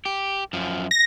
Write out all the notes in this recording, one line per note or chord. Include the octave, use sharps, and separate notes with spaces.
G4
F#2 F3
A#6